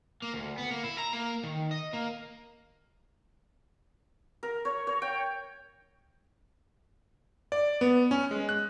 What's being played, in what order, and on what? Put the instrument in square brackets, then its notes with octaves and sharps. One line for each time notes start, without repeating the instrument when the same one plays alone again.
[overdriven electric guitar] A#3
D2
B3
A#3
E4
A#5
A#3
D#3
D#5
A#3
[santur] A#4
C#5
C#5
G5
[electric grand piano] D5
B3
C#4
G#3
F#6